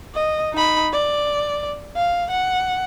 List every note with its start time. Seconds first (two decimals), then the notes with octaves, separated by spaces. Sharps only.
0.15 D#5
0.54 D#4 B5
0.93 D5
1.96 F5
2.30 F#5